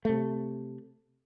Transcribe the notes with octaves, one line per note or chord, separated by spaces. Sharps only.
C3 A3